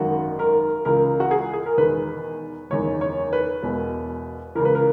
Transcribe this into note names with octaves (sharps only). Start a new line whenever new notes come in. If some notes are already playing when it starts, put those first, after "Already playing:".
Already playing: G#1 F#2 D#3 F#4
A#4
C#2 C#3 E3 A#4
F#4
G#4
G#4
A#4
E1 E2 D#3 B4
F#1 E2 D#3 C#5
C#5
B4
E1 E2 B2
C#2 C#3 E3 A#4
B4
A#4